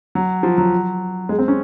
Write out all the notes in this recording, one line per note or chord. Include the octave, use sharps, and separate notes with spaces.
F#3
F3
F#3
G#3
C4
C#4